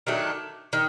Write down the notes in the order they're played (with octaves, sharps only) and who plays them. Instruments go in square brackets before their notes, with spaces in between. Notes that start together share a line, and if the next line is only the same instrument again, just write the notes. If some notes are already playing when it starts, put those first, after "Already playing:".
[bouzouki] D#3 F#3 A3 D4
D#3